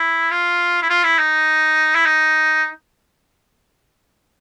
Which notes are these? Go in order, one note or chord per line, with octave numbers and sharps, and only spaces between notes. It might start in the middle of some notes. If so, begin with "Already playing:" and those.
Already playing: E4
F4
E4
F4
E4
D#4
E4
D#4